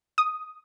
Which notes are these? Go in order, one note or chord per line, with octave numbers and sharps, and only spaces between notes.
D#6